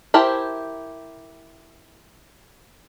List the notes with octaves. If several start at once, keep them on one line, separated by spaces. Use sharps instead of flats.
E4 G4 A#4 C5 A5